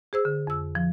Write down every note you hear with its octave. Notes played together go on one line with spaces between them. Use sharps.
G#4 C5 E6
D3
F2 E6
F3